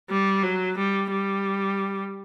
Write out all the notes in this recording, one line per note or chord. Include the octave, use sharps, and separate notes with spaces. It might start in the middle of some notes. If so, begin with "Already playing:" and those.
G3
F#3
G3
G3